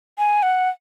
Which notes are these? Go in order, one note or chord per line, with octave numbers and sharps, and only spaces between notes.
G#5
F#5